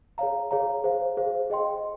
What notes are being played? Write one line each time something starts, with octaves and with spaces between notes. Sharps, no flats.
G#4 C#5 F5 A#5
G#4 C#5 F5 A#5
G#4 C5 F5
G#4 C5 F5
G#4 D#5 G5 C6